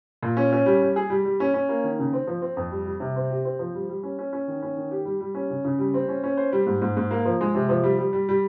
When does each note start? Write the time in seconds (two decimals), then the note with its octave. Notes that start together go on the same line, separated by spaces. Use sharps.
0.23 A#2
0.37 C#4
0.53 C#4
0.66 G3
0.82 G3
0.96 G#4
1.10 G3
1.25 G3
1.40 C#4
1.54 C#4
1.69 A#3
1.84 D#3
1.99 C#3
2.13 C4
2.28 F3
2.42 C4
2.57 F2
2.71 G3
2.86 G3
3.00 C3
3.16 C4
3.31 G4
3.45 C4
3.59 F3
3.75 G3
3.89 G3
4.03 C#4
4.19 C#4
4.33 C#4
4.48 D#3
4.63 C#4
4.77 D#3
4.91 G4
5.05 G3
5.21 G3
5.35 C#4
5.50 C#3
5.65 C#3
5.79 G3
5.94 C4
6.08 C#4
6.24 C#4
6.37 C5
6.53 G3
6.66 G#2
6.82 G#2
6.97 G#2
7.11 A#3
7.26 F3
7.41 G#3
7.55 C3
7.69 F3
7.84 G3
7.99 G3
8.13 G3
8.29 G3